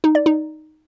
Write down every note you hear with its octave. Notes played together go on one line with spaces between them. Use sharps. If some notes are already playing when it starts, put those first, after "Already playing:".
D#4
D5
D#4